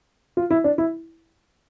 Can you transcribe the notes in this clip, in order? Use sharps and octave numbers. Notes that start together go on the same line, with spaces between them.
F4
E4
D4
E4